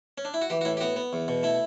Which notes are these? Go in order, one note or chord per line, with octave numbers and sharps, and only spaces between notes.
C#4
D4
E4
F#4
E3 G4
F#4
A2 E4
G4
B3 F#4
B3
E2
B2
A3 E4